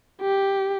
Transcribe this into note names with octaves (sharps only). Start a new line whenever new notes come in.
G4